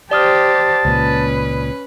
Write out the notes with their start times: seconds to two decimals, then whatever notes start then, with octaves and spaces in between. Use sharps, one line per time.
0.11 G4 C5 D5 A5 D#6 F6
0.85 C#2 A#2 C#4 B4